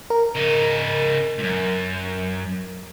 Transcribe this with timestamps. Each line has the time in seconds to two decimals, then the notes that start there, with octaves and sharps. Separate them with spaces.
0.10 A#4
0.35 C#3 D#4
1.38 C#2 F#2